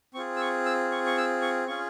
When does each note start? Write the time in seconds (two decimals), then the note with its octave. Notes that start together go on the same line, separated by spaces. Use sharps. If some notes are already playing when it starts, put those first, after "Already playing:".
0.14 C4 F4 G#4 C#6
0.37 E6
0.41 C#6
0.66 E6
0.92 C#6
1.07 C#6
1.17 E6
1.42 C#6
1.68 C#4 F4 G#4 C#6